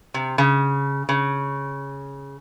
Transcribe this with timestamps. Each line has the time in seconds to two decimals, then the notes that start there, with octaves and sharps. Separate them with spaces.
0.14 C3
0.38 C#3
1.09 C#3